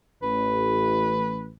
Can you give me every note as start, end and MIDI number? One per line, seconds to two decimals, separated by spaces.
0.22 1.54 33
0.22 1.48 71